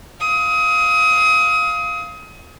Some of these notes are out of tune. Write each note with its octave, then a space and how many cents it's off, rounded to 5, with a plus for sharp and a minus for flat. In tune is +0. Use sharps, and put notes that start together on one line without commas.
F5 -5 D#6 +30